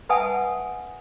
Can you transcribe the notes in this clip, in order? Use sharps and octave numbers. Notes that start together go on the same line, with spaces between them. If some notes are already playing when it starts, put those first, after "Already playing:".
B4 E5 F#5 G#5 A5 D#6